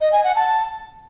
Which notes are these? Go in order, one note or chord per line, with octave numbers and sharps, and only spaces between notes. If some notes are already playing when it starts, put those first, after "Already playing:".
D#5
G#5
F#5
A5